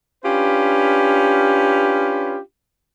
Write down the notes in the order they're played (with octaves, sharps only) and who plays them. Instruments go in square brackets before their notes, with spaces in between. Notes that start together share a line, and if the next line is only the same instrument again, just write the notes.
[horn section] C#4 D4 F4 G4 B4